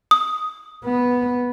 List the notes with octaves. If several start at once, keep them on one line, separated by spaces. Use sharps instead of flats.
D#6
B3